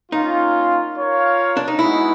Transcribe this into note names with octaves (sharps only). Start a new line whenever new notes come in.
A#3 C#4 D#4 F4
F4 A#4 C#5 F5
D4
D#4
G#3 B3 D#4 E4 F#4